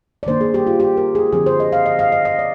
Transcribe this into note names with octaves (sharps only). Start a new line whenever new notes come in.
D5
D#3 A#3 D4 C5
G#4
G4
F4
G4
A#4
G#4
D3 F3 C4 G#4
C5
D#5
F5
D#5
F5
D#5
D#5
D5